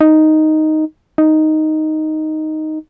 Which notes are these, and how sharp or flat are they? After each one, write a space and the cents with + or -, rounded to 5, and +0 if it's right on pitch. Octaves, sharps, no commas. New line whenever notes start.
D#4 +0
D#4 +0